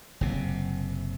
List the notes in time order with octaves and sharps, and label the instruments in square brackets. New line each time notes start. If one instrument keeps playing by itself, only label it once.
[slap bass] F#1 C3